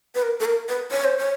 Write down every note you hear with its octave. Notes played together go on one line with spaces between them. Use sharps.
B4
A#4
A4
A#4
B4
C#5
C5
C#5